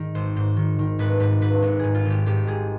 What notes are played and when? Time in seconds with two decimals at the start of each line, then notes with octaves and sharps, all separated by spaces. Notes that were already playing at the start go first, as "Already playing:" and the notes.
Already playing: G#2 D#3
0.15 G#1 C5
0.36 G#2 C5
0.57 D#3
0.79 D#3
0.99 G#1 B4
1.20 G#2 B4
1.41 G#2 B4
1.62 G#1
1.79 G#2 G#4
1.94 F4
2.05 G#1
2.10 G4
2.26 G#1 G4
2.47 G#2 G#4